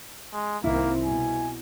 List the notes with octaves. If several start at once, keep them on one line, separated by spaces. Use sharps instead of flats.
G#3
C2 D#3 A#3 C4 E4
B2 G#5